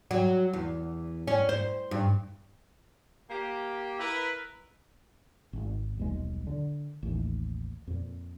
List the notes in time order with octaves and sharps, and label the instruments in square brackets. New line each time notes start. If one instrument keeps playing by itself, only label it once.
[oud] F#3
E2
C#4
C5
G2
[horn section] A#3 G4
E4 A#4 B4
[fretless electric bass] G#1
D#1 B1 G#3
D3
A1 D#2
F2 A#2